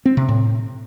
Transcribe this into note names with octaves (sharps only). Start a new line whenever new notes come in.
C4
C3
A2